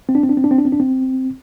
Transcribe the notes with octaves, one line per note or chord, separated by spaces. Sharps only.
C4
D4
C4
D4
C4
D4
C4
D4
C4
D4
C4